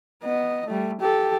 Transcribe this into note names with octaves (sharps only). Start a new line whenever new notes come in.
B3 D#5
G3 A3
G4 A4